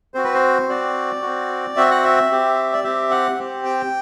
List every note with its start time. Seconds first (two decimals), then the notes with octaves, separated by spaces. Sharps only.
0.14 C4 F#4 C5
0.24 B4
0.34 C5
0.69 C4 F#4 D5
1.22 C4 F#4
1.76 C4 F#4 E5
1.91 F#5
2.04 E5
2.31 C4 G4
2.73 D5
2.84 C4 G4 E5
3.11 F#5
3.39 C4 G4
3.65 G5